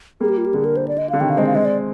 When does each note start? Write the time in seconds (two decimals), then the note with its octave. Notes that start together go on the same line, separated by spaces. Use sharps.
0.20 G3 A#3 G#4
0.29 G4
0.37 F4
0.46 G4
0.54 D3 G#4
0.65 A#4
0.77 C5
0.88 D5
0.98 D#5
1.10 D3 F5
1.20 C3 D#3 G5
1.30 F5
1.37 G#3 C4 D#5
1.47 F5
1.54 G#3 C4 D#5
1.65 D5